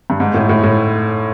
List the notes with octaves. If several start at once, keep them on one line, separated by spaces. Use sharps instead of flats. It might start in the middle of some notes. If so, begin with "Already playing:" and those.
G2
G#2
A2
A2
A2